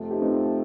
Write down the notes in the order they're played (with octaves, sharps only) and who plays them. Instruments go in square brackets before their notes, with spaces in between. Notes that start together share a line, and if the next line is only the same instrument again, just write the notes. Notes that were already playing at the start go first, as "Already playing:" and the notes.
Already playing: [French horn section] F2 C3 F3 A3
[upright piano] D#4 G4
C4 D#4